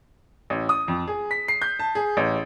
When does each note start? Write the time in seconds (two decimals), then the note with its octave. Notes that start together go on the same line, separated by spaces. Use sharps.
0.50 A1
0.69 D#6
0.88 F2
1.07 G#4
1.31 B6
1.48 C7
1.62 G6
1.79 A5
1.95 G#4
2.17 A1